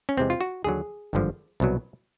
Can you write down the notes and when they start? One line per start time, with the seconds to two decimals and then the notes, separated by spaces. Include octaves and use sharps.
0.09 C#4
0.17 E2 C3 E3 G#3 C4
0.30 F4
0.41 F#4
0.64 D#2 D3 F#3 G#4
1.13 G#1 G2 D3 F3
1.60 C2 B2 F#3